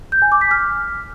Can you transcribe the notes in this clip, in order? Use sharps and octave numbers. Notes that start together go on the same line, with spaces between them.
G6
G#5
D6
B6
F6